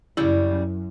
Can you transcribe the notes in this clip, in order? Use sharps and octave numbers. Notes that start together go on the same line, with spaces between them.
F#2 C#3 G3 E4